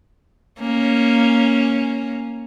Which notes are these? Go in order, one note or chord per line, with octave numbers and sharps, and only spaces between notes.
A#3 C#4